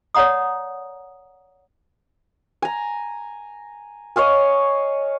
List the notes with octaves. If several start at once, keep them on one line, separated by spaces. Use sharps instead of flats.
C#5 D5 F#5 A#5 D#6
G#5 A#5
C#5 D#5 F5 G#5